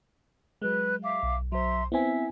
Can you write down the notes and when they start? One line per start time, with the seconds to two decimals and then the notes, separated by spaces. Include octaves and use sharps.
0.62 F#3 G#3 B4 F#6
1.03 E5 F5 D6
1.23 B1
1.52 F#3 C5 E5 A#5 C6
1.92 B3 C4 E4 E5 G#5